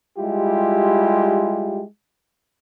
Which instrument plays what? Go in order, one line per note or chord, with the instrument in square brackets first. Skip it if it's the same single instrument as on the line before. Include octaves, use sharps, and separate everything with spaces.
[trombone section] G3 G#3 E4 F4 G4